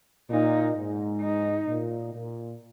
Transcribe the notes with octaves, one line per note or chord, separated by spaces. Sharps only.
A#2 D#4
G#2
D#4
A#2
A#2